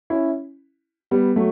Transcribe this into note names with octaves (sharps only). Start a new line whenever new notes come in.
C#4 E4
G3 B3
F#3 A3